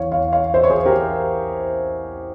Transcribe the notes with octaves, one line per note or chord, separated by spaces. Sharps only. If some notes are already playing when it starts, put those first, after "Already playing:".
Already playing: E2 E3 C#5 F5
C#5 F5
C#5 F5
C5 E5
C#5
G#4 C5
G4 A#4